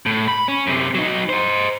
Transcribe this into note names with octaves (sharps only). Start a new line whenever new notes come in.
A2
B5
C#4
F#2 C3
F#3 D#4
C5 D#5